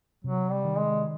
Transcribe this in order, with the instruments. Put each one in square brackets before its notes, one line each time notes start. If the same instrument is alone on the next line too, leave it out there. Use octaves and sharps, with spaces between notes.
[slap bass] C3 [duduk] F#3
[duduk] G3
[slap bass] D#3
[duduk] G#3